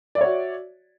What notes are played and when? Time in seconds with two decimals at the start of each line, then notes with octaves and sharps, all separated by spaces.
0.15 D5
0.18 E5
0.21 C#5
0.24 F#4